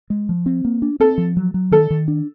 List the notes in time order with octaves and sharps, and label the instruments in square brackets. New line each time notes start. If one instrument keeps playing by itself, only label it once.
[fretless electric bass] G#3
F3
C4
A#3
D4
[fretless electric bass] C4 [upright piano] A4
[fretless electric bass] F3
F#3
F#3
[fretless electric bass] D#3 [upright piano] A4
[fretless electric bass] D#3
D4